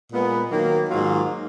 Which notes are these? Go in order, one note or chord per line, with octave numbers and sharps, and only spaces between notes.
A#2 G#3 B3
D#3 F#3 A#3
G#2 D#3 F#3 A#3 F4